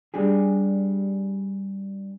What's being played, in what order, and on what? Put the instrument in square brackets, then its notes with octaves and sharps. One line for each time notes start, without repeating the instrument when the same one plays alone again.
[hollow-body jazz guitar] G3 D4 G4 G#4